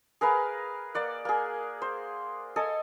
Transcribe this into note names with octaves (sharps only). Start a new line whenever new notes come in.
G#4 A#4 B4 F5
A#3 D5 F#5
A#3 G#4
C5
A4 D#5 G#5